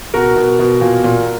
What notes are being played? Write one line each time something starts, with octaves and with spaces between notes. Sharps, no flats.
B2 F#4 A#4
B2
B2
A#2
A#2